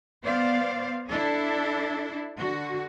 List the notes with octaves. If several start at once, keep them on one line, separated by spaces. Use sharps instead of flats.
B3 C5 D5 F5
D4 E4 A4
D3 F#4